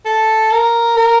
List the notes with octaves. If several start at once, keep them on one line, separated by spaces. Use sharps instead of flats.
A4
A#4
A#4